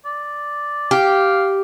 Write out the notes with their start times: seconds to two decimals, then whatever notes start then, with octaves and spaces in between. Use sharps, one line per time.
0.05 D5
0.91 G4 F5